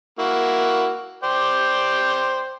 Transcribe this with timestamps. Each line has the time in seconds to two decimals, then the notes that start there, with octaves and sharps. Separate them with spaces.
0.19 A#3 E4 F#4
1.23 C5 D5 G5